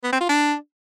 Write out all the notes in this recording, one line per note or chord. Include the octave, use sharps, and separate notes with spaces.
B3
C4
F4
D4